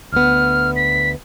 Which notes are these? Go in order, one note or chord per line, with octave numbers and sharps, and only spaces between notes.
D2 B3 F6
B6